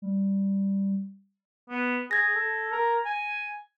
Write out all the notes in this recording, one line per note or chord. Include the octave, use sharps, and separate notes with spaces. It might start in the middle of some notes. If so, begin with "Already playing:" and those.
G3
B3
G#4 G#6 A#6
A4
A#4
G#5